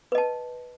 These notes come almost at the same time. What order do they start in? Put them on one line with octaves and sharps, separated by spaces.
B4 D#5 A5